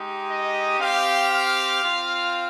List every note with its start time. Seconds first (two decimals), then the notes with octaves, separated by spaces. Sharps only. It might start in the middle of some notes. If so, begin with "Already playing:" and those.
Already playing: G#3 D#4 G4
0.28 D#5
0.79 C4 G4 F5
1.31 F5
1.83 C4 F4